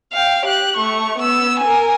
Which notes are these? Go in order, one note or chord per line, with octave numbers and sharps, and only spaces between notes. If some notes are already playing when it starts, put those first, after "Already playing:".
F5 G5
G4 F#6
A3 C#6
B3 E6
A#4 G#5